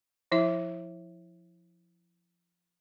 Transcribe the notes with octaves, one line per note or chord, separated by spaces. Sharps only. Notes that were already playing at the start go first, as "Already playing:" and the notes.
F3 E4 E5